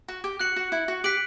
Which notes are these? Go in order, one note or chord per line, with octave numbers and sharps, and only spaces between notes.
F#4
G4
F#4 F#6 C#7 F#7
F#4
E4
F#4
G4 F#6 B6 D7 F#7